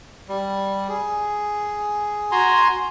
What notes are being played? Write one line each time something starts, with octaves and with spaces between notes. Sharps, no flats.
G3
G#4
F#4 G#5 A#5 C6